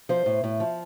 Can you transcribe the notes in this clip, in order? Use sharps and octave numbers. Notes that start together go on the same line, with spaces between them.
F3 C5
A2
A2
F3